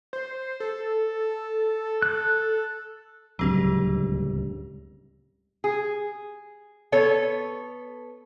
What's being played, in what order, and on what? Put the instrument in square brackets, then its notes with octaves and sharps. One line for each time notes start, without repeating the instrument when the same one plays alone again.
[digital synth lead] C5
A4
[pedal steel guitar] F#6
[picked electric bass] D1 C#2 G2 [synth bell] F#3 C4 G4
[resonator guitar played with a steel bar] G#4
B3 A4 C#5